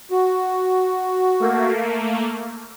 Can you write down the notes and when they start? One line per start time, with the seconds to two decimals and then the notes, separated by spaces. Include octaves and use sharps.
0.11 F#4
1.40 A3 A#3